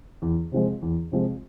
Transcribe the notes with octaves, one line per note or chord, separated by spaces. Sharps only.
E2
C3 F3 G#3
E2
C3 F3 G#3